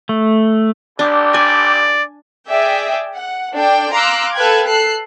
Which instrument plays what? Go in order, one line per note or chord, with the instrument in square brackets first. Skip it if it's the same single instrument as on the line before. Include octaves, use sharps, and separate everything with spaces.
[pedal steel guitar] A3
[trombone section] A1 G4 [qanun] D4
[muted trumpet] D5 [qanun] G#5
[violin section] G#4 D5 E5 G5
F#5
D4 A4 D5 G5
F5 A#5 C6 D6 E6 F#6
A4 B4 F5 G5 F#6 G#6
A4 F#6 C7